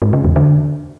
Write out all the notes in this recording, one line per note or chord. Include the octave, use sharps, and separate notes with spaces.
G#2
C#3
E2
D3